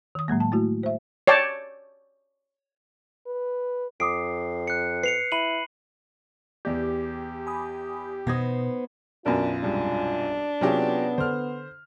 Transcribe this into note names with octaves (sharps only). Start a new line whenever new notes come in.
D#3 D#6
A2 F#3 G#3 A#3
A5
A3 E4 F#4
C5 E5
C#5 D5 G5 A5
B4
F2 D6 D#6 C7 D7
F#6 C#7
B4 C7 C#7 F7
E4 B5 D#7 F#7
E2 G4 D5
G#5 B5 D#6
B2 B3 D#4 C5 D#6 G#6 A#6
B1 F#2 B3 D4 F4 A#4
C2 G#2 D4
C3 F#3 B3 C#4 F4 G4 G#4
D3 C5 F6